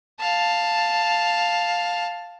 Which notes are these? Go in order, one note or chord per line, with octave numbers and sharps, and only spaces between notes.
F5 A5